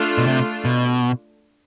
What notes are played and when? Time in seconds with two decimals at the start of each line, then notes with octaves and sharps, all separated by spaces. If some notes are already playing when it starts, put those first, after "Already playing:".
Already playing: A3 D4 F4
0.18 B2
0.27 C3
0.65 B2